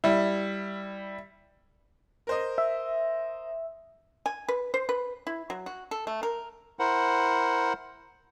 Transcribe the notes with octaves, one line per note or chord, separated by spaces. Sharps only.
G3 E4
A#4 C5 D#5
E5
G#5
B4
C5
B4
E4
F#3
F#4
A4
A3
A#4
E4 A#4 C5 F#5